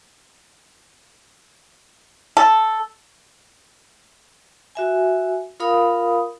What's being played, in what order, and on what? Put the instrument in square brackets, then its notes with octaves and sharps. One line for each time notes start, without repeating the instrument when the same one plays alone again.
[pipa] A4
[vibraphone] F#4 E5 G#5
F4 A#4 F5 B5 D#6